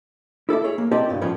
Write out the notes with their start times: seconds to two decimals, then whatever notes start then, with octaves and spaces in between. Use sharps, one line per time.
0.49 E4 A4 D5 E5
0.64 G#4 C#5
0.78 A#3
0.92 C4 E4 G4 D5 D#5 A5
1.09 C#2 G2 B2
1.21 F#2 A2 F3 C#4 B5